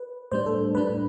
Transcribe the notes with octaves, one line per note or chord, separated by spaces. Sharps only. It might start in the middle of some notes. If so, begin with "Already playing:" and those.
Already playing: B4
A2 G3 D4 C5
A4
A2 G3 D4 B4